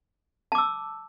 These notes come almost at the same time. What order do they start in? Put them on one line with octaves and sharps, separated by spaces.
A5 D6 E6